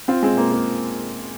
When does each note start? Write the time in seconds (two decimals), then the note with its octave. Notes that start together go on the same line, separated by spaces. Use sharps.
0.08 C4 F4
0.23 G#3 C4
0.37 A#3
0.51 A#3